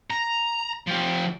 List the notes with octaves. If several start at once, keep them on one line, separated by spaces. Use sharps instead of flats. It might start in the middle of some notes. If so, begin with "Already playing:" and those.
A#5
F3 G4